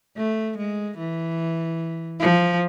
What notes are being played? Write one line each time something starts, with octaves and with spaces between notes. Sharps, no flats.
A3
G#3
E3
F3